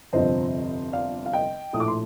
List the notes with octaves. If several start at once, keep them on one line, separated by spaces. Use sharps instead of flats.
G1 F2 C3 F3 C4 C5 D#5
D5 F5
F5
D#5 G5
A#1 A2 A3 D#6
D6
C6